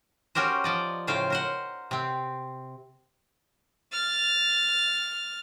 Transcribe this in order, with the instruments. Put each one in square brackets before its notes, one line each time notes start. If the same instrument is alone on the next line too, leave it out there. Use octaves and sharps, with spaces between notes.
[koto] C#4 F#4 G4 A#4 C5
F3 D5 D#5
A2 C#3 C5 F5 G5
A#4 C5 F#5
C3 C4
[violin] F6 A6